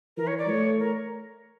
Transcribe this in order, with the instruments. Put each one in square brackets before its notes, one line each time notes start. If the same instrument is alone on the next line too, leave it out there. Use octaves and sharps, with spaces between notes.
[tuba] E3 [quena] A#4
[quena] C#5
D5
[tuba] A3 [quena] C#5
[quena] A#4